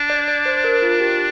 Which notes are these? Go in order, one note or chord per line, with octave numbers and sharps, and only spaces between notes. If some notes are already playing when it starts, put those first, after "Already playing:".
Already playing: D4
D5
D5
C5
A#4
F4
G4